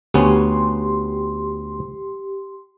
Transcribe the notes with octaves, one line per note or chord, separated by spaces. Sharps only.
D2 B3 C#4 G4 C6